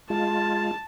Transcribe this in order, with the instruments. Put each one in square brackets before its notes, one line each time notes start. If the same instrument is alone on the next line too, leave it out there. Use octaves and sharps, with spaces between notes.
[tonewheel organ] G#3 F4 [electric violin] A5